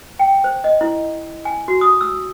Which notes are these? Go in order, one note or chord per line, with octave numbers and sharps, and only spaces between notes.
G5
C5
D#5
E4
G#5
F#4
D#6
E6